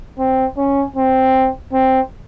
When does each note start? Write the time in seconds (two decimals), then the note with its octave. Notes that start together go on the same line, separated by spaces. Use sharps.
0.19 C4
0.57 C#4
0.96 C4
1.73 C4